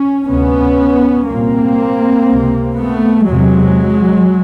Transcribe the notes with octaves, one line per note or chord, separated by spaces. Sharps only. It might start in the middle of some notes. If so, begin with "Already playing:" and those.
Already playing: C#4
D2 C3 B3 C#4
C2 A#2 A#3 C4
C#2 C3
A3 B3
E2 C3 F#3 G#3